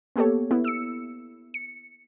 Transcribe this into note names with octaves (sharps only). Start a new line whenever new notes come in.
A#3 B3 G4 A4 C#5
B3 E4
E6 C#7
C#7